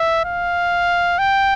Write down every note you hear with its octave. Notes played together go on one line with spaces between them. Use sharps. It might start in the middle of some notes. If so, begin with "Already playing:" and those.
Already playing: E5
F5
G5